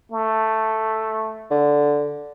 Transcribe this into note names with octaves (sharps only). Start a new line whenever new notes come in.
A3
D3